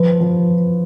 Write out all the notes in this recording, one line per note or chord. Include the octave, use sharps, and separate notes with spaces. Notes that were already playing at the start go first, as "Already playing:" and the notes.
Already playing: F3 B4
F3